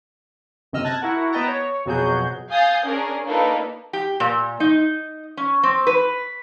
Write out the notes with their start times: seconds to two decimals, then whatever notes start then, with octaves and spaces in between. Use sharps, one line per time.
0.73 G1 F#2 C3 D#5 E6 F6
0.84 A5 F#6 G#6 A#6
1.02 E4 F#4 A#4 F#5
1.33 B3 B4 D#5 G5 A5 A#5
1.48 C#5
1.86 F2 B2 F#3 F#4 G#4 G6
2.50 F5 G#5 D#6 G6 A6 C7
2.84 C#4 D4 G#4 A#4
3.25 A#3 D4 D#4 F4 A4 B4
3.93 G4
4.20 A#2
4.60 D#4
5.37 C#4
5.63 C4
5.87 B4